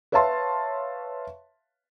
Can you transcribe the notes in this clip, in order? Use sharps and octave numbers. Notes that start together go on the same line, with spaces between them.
B4 C#5 E5 F5 A5 C6